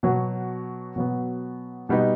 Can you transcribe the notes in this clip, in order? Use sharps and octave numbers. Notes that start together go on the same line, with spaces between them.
B2 F#3 B3
B2 F#3 B3
B2 G3 B3 D#4